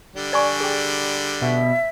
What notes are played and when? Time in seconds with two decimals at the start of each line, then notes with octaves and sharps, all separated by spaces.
0.15 D3 G3
0.33 D5 G#5 C#6
0.61 G#4 G5
1.41 B2 E5